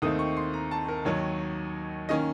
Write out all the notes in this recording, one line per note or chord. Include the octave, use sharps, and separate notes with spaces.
D#2 D#3 A3 C4 D#4 D#6
C#6
C6
A#5
A5
A#4
D#2 D#3 F#3 C#5
D#3 A#3 C#4 D#5